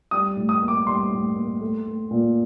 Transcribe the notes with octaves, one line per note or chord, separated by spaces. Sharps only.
G3 D#6
A2
D#6
A#3
D6
G3 C6
A2
A#3
A3
A3
A#2